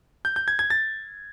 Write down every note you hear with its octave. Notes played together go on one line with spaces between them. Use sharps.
G6
G6
G#6
G#6
A6